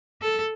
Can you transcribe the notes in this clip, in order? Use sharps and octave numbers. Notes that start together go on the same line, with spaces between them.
A4